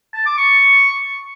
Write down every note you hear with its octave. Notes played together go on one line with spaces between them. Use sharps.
A5
D6
C#6